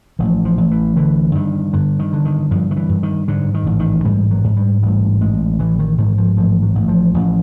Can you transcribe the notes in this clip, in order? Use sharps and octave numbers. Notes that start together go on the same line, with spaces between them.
A1 F3
F3
A1
E3
D3 E3
G2 D#3
G2 D3
D#3
D3
D#3
G2 F3
D#3
E3
G2
D#3
G#2 D3
D#3
A1
D#3
G#2 G3
F#3
G#2
G3
A1 G3
A1 G#3
A1 E3
D#3
G#2 D#3
F3
A1 F3
F#3
A1
F3
A1